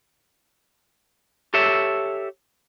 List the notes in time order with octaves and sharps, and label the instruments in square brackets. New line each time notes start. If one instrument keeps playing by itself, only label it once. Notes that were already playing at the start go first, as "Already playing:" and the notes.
[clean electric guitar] G4 A4 C#5 E5